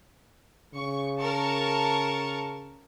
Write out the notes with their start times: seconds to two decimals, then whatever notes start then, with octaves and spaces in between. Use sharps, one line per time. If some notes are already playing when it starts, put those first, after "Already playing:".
0.74 C#3 C#6
1.18 A#4 A5 C#6